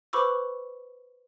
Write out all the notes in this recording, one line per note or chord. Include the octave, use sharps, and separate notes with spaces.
B4 C5 B5 C#6 D6 E6